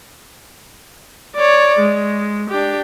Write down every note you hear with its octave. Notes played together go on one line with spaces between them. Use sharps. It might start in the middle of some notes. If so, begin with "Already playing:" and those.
C#5 D5
G#3
D4 G4